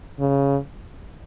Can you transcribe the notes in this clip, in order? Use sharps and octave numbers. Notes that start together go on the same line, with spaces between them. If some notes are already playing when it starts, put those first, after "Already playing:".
C#3